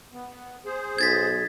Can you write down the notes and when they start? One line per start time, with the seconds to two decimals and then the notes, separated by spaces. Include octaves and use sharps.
0.12 B3
0.65 G#4 C5
0.98 B1 G#6 A6 B6